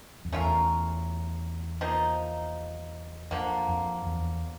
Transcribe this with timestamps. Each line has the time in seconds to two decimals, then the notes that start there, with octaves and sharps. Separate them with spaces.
0.25 F2
0.32 E2 A3 C#4 F4 A#4
1.81 F3 A#3 D#4
3.31 F2 D3 F3 A#3
3.69 F2
4.06 E2